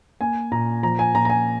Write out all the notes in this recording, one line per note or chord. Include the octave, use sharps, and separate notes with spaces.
A#3 G#5
A#2 A#5
F3 A#5
G#5
A#2 A#5
A#5
G#5